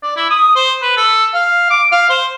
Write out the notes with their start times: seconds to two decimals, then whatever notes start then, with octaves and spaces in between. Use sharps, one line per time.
0.03 D5
0.17 E4
0.30 D#6
0.56 C5
0.82 B4
0.97 A4
1.34 F5
1.70 D6
1.92 F5
2.10 C5